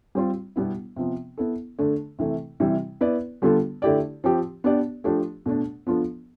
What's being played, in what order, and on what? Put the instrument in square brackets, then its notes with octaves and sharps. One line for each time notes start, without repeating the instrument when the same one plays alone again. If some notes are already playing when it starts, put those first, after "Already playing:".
[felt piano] G3 C4 F4
B2 G3 B3 E4
C3 F3 B3
B3 E4 A4
D3 A3 D4
C3 E3 A3
C3 E3 G3
B3 E4 B4 D5
D3 G3 B3 F4 A4
D3 A3 E4 G4 D5
F3 C4 G4
B3 D4 G4 D5
F3 A3 D4 G4
B2 A3 D4
F3 B3 D4 F4 A4